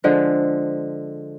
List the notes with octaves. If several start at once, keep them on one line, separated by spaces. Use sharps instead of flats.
D3 F3 G#3